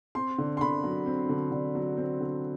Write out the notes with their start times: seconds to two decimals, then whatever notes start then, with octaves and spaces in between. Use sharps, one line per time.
0.15 C4 C6
0.38 D3
0.57 C6
0.61 D3 B5
0.83 F#3
1.06 C4
1.29 D3
1.52 D3
1.75 F#3
1.97 C4
2.20 D3